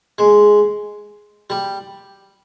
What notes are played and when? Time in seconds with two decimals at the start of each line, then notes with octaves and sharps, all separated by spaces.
0.18 G#3
1.50 G3